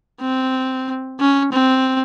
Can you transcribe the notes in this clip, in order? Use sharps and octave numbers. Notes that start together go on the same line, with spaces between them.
C4
C#4
C4